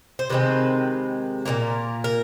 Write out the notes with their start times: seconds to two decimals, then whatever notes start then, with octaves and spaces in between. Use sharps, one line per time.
0.19 C5
0.29 C3 D#3 G#3 C4 B4
1.45 A#2 F3 A#3 A#4
2.04 A#4